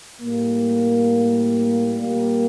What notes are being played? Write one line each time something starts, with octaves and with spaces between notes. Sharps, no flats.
A2 G3 A#3
A#2 G3 A#3